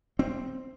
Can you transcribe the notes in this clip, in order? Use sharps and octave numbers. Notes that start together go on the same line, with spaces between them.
C4